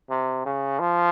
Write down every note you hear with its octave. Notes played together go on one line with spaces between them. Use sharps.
C3
C#3
F3